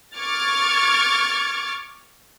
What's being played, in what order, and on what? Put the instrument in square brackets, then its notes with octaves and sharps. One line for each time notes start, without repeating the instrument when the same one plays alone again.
[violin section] C#6 D6 F6 G#6 A6